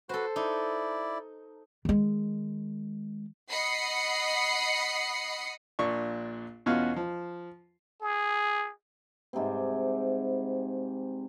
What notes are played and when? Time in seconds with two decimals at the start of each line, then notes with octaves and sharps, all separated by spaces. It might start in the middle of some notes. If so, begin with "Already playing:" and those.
0.09 F#4 A4 B4 C5
0.36 D#4 E4 D5
1.85 D#3 G#3
3.51 D#5 F#5 B5 D#6 C7 C#7
5.79 A#1 A#2 D4 C#6
6.66 E2 B2 C#4 F4 F#4 F5
6.96 F3
8.02 G#4
9.33 G#2 C3 G3 C4